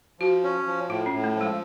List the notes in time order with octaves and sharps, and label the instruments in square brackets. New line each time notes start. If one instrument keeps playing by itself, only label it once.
[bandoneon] F3 [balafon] F#4
[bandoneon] C#4
F3
[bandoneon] A2 [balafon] F4
[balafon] C#4
[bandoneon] A2
[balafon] A3
[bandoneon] F3
[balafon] G#3